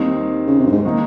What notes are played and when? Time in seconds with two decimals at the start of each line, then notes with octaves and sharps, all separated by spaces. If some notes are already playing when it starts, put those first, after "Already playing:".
Already playing: D#2 D#3 G3 C4 D#4
0.47 C#3
0.59 C3
0.66 G2
0.72 G#2
0.85 D#3 A#3 D#4